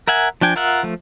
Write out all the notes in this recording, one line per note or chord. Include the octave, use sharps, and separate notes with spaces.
A#4 E5 F#5 G#5
F3 D4 G5 G#5
F4 A#4 E5 F#5
F3 A3